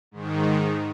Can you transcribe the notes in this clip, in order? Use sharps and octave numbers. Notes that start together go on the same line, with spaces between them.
G#2 D#3